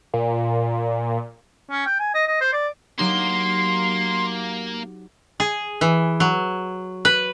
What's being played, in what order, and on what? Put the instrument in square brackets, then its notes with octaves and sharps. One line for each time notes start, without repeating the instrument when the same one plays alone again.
[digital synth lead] A#2
[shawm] C#4
G5
G#5
D#5
D#5
C5
D5
[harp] F#3 D#4 G4 [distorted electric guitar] A#3 [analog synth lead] C6
[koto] G#4
E3
F#3
B4